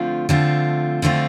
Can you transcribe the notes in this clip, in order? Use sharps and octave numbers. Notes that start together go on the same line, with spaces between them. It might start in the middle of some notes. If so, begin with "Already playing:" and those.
Already playing: D3 F3 A3 C4 F4
D3 F3 A3 C4 F4
D3 F3 A3 C4 F4